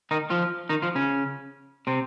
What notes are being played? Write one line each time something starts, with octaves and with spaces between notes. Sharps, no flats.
D#3 D#4
F3 F4
D#3 D#4
F3 F4
C#3 C#4
C3 C4